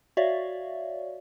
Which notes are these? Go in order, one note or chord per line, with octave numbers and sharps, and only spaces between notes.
F#4 C#5 D5 E5 F5